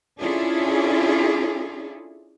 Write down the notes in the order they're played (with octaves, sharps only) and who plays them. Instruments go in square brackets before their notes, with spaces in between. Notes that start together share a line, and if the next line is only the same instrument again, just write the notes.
[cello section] C#4 D4 E4 F4 G#4 A4